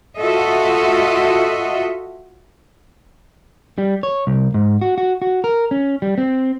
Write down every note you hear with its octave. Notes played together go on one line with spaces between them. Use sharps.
F4 F#4 A4 D#5 E5
G3
C#5
C2
G#2
F#4
F#4
F#4
A#4
C#4
G3
C4